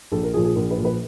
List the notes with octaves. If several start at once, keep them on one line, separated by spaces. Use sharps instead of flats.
A#1 A4
A#4
A#2 F3 G#4
G#4
A#1 A#4
B4
A#2 F3
B4